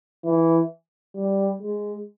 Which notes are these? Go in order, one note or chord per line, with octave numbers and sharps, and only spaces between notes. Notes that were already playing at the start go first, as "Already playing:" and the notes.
E3
G3
G#3